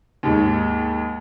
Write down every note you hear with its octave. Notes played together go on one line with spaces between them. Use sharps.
D#2 G#2